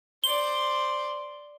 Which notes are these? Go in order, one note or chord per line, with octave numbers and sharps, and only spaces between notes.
C5 D5 G7